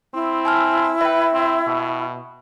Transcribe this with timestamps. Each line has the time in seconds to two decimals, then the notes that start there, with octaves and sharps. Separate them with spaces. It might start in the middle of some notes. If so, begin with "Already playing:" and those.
0.14 C4 E4
0.45 G#5 A5 F6
1.01 B4 E5 G5
1.33 C4
1.67 B2